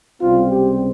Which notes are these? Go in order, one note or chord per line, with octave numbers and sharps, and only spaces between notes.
C#2 C3 G3 C4 F4
G4